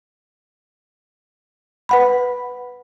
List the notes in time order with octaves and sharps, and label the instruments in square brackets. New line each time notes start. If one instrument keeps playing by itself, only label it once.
[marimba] B4 F#5 B5